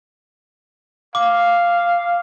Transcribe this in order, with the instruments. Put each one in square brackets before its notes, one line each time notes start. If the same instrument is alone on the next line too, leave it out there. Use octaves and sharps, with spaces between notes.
[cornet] F5 [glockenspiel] D6